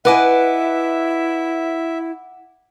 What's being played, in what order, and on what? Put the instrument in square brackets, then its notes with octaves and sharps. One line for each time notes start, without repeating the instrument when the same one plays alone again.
[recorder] E4 [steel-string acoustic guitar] B4 D#5 G#5 [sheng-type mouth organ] E5 [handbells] F#5 D6